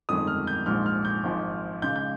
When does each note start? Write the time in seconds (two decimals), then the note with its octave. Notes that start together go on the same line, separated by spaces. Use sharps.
0.09 G1 F2 D#3 G#3 D#6
0.27 F6
0.47 G6
0.66 A#1 G#2 F3 G#3 F6
0.86 F6
1.05 G6
1.24 G#1 G#2 F3 G#3
1.82 C#2 C#3 G#3 G6
1.96 G6